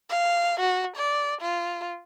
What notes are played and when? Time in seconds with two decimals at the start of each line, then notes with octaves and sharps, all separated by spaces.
0.10 F5
0.60 F#4
0.97 D5
1.42 F4